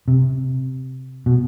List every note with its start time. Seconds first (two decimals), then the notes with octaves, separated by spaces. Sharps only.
0.08 C3
1.26 B2